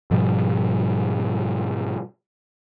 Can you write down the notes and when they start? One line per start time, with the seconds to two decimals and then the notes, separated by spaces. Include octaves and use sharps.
0.11 G#2 B2 F3 G3